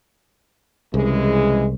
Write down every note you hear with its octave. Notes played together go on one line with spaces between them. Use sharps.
C2 C#3 E3 G#3